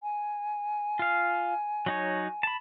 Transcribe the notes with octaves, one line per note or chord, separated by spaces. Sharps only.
G#5
F4 F5
F#3 D#4 C#5
A5 B5